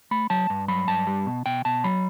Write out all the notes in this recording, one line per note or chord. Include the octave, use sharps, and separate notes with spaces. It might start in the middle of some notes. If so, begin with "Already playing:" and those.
A3 B5
F#3 A5
G2
F#3 B5
G2 A5
G3
B2
B2 G5
B2 A5
F#3 B5